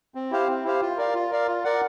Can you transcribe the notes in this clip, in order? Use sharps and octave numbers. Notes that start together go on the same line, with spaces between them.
C4
E4 G4 C5 F5
C4
E4 G4 C5 F5
F4
A#4 D5 F5
F4
A#4 D5 F5
F4
A#4 D5 F#5